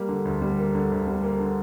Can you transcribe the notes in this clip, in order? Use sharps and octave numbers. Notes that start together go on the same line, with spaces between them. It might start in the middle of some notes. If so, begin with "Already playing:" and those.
Already playing: G3 A#3
D3
D2
G3
A#3
D3
D2
G3
A#3
D3